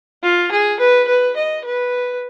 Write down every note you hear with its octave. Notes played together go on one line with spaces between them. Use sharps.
F4
G#4
B4
B4
D#5
B4